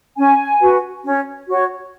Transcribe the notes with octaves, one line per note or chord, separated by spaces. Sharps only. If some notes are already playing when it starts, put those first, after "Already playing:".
C#4 G#5
F#4 B4
C#4
F#4 C#5